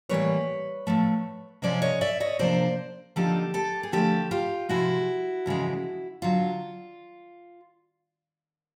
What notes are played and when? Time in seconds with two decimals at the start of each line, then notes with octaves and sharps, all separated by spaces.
0.09 A2 E3 G3 A#3 B4 C#5
0.87 A2 F3 A3
1.62 C3 F3 G#3 C#4 C5 D5
1.82 C#5 D#5
2.01 D5 E5
2.20 C#5 D#5
2.39 C3 F3 A#3 D4 C5 D5
3.16 D3 F3 A#3 D#4 G4 A4
3.54 G4 A4
3.83 G#4
3.92 D3 F3 A3 G4 A4
4.31 F4 G4
4.69 C3 F3 G#3 E4 F#4
5.46 F2 C#3 E3 G#3
6.22 D3 F#3 F4